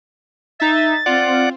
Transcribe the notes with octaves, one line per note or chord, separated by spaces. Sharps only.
D#4 E5 A6
C4 F4 D5 F#5